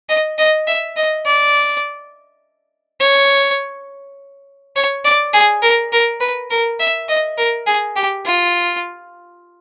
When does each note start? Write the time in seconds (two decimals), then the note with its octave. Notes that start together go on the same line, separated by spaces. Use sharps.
0.09 D#5
0.38 D#5
0.67 E5
0.97 D#5
1.26 D5
3.00 C#5
4.76 C#5
5.05 D5
5.33 G#4
5.63 A#4
5.93 A#4
6.21 B4
6.51 A#4
6.80 E5
7.09 D#5
7.38 A#4
7.67 G#4
7.96 G4
8.25 F4